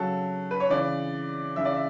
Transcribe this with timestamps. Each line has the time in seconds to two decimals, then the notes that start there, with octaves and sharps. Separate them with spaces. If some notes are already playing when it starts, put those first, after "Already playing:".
Already playing: C#3 F#3 A4
0.51 B4
0.60 C#5
0.70 C#3 E3 D5
1.56 C#3 E3 E5
1.65 D5
1.74 E5